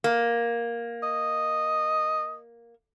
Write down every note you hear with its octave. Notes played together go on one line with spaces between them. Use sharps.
A#3
D#5